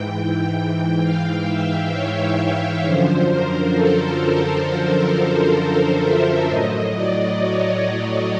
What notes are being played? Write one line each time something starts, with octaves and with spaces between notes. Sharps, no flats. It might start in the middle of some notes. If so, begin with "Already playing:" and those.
Already playing: G#2 E3 G5
F5
E5
C#5
F#2 D3 F3 C5
A#4
A4
A#4
C5
E5
A2 F#3 D#5
D5
C#5
D5